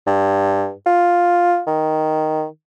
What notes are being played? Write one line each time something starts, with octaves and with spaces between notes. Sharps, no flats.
G2
F4
D#3